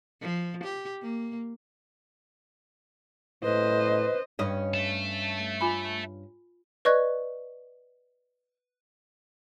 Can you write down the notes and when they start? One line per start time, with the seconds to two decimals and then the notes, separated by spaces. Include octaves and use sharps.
0.21 F3
0.64 G4
1.02 A#3
3.44 A2 B4 C5 D#5
4.39 G2 C#4 D#5
4.74 E5 A5
5.61 F4 G#5 B5
6.85 B4 D5 D#5 C#6 F#6 G#6